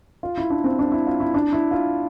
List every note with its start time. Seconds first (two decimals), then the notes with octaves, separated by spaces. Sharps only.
0.23 F4
0.37 E4
0.50 D4
0.64 C4
0.79 D4
0.92 E4
1.07 F4
1.20 E4
1.34 D4
1.53 E4
1.71 F4